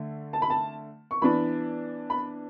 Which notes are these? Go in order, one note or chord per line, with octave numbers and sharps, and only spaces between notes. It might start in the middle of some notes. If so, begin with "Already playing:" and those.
Already playing: D3 A3
A5
B5
A5
C#6
E3 B3 D4 B5
B5